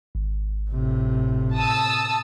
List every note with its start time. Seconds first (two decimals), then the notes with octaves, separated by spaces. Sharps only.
0.15 G#1
0.70 A2 C3
1.56 A5 D#6 E6